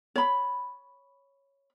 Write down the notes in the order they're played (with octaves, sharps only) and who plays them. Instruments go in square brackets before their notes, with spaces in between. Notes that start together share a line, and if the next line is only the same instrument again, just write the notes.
[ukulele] C#5 B5